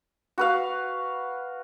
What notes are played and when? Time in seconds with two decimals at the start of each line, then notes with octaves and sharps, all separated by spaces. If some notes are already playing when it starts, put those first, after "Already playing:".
0.38 F#4 B4 F5